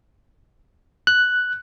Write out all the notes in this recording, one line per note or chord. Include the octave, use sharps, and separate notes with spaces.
F#6